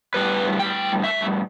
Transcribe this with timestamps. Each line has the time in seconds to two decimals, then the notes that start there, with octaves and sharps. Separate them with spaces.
0.14 A2 G3 B3 B4
0.59 G5
1.04 E5